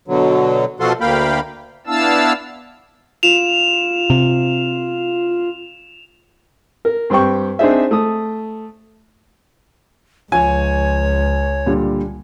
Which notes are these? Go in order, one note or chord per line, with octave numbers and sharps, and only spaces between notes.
B2 D3 F#3
B2 F3 F4 F#4 A4 C6
D2 A#3 F5 G5 B5
B3 D4 E4 F5 A5 E6
F4 E7 F7
C3
A#4
G2 C4 G4 G5 C#6
C4 D4 D#4 G#4 C5 E5
A3 D#6
C#2 F3 C#5 G#5
A#2 D3 G3